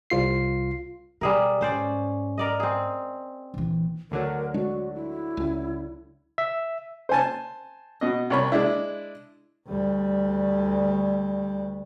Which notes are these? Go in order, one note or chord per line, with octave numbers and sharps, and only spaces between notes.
C2 F4 C7
B2 G3 G#4 A#4
G#2 C#4 C5 D5
A#4 D5 D#5
C4 G#4
A#1 E3
D2 D3 F#3 A#4
G#3 D4 F#4
E4
C#2
E5
C5 G#5 A5
B2 D#5
C2 C#5 B5
G#3 D4 E4
D2 G3